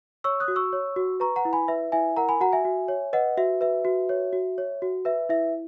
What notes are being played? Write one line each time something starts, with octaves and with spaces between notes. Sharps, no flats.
C#5 C#6 E6
D#6 F#6
F#4
C#6 E6
C#5
F#4
B4 A#5 C#6
F#5 A#5
E4
G#5 B5
B4 E5
E4 E5 G#5
A#4 F#5 A#5
G#5 B5
F#4 F#5 A#5
E5 G#5
F#4
C#5
B4 D#5 F#5
F#4 E5
B4 E5
F#4
C#5
F#4
C#5
F#4
B4 E5
E4 E5